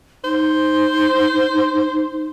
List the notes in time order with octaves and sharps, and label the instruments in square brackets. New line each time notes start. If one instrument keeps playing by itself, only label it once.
[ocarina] D#4 [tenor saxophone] C5